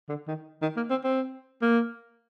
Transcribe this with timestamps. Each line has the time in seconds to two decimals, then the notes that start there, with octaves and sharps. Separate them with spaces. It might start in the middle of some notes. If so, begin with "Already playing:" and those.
0.09 D3
0.28 D#3
0.62 D#3
0.76 A#3
0.90 C4
1.04 C4
1.62 A#3